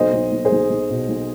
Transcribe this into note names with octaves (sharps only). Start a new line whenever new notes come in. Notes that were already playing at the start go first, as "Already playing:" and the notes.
Already playing: B1 C5 D#5
B1
B1
G#4 C5
B1
B1
B2
B1